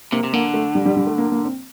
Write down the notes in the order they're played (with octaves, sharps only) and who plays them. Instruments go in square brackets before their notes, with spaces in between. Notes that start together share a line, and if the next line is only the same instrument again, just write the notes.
[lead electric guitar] C3 [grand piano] A#3
[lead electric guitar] C3
[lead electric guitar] D3 [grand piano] A#3
[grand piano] A3
G3
G3
G3
A3
A#3
A#3
C4